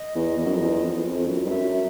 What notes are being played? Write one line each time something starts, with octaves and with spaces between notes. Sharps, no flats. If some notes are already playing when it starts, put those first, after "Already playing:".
Already playing: D#5
E2
E2
F#2
F2
E2
F2
E2
F2
F#2
G2 D#5
F#2 E5